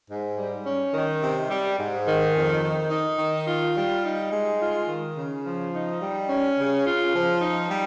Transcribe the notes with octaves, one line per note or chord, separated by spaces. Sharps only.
G#2
G3
C#4
D#3
C3
G3
G#2
D#3
F2
D#3
D#4
D#3
F4
G3
D#4
G#3
F4
D#3
C#3
F3
D#4
G3
C#4
C#3
F4
F3
D#4
G3